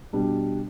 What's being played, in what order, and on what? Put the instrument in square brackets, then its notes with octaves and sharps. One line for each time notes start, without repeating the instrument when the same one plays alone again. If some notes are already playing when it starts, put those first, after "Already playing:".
[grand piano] B2 G3 D4